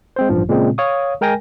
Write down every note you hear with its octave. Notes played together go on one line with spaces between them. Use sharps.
G#3 C4 C5
A1 G2 F3
A#2 C#3 G#3 C4
C#5 F5 C#6 D#6
G#3 A#4 G5 G#5 A#6